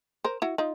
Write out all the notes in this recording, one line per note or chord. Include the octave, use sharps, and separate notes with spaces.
A#4 C5
E4 F#4
D#4 F4